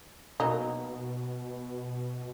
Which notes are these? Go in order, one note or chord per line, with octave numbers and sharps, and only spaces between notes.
B2 F#3 A#3 D#4